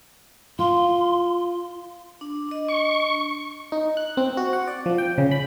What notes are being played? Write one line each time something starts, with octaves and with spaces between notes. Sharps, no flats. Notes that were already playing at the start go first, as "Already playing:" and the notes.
F4 C6
D4
D4 D#5
C#6
D#4
F#6
C4
F#4
F#5
D5
F3
G5
C#3
B5